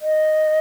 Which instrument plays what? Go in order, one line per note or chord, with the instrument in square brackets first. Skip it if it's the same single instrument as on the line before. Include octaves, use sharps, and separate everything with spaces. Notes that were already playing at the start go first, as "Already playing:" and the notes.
[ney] D#5